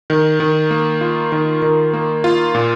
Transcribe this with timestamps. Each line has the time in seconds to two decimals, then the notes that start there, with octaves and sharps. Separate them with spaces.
0.10 D#3
0.40 D#3
0.71 A#3
1.01 F4
1.32 D#3
1.62 D#3
1.93 A#3
2.24 F4
2.55 A#2